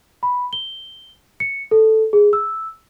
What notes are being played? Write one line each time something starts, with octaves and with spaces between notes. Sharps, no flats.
B5
G7
C#7
A4
G#4
E6